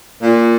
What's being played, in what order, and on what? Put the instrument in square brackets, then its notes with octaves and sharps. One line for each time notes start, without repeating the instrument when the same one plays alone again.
[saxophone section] A#2